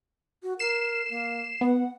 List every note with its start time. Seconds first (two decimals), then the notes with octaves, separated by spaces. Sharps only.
0.43 F#4
0.59 A#4 C7 E7
1.10 A#3
1.61 B3 F#5